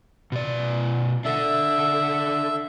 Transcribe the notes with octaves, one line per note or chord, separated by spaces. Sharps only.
B2 D5
D4 A4 E5